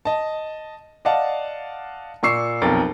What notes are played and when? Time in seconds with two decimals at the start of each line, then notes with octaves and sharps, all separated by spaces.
0.05 D#5 A5
1.05 D5 D#5 F5 F#5 A5
2.23 A#2 D5 C#6 E6 C7 C#7
2.62 B1 F2 A#4 A6